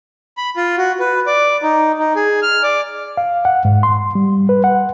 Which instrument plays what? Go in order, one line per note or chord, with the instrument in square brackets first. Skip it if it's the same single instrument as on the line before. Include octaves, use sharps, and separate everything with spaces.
[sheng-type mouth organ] B5
F4
F#4
B4
D5
D#4
D#4
G#4
F6
D5
[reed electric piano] F5
F#5
G#2
C6
G3
B4
F#5